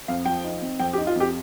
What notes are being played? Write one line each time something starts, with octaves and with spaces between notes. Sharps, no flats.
F2 F5
F3 G5
D#4
C4
F2 G5
G4
D#4
F4
F2 G4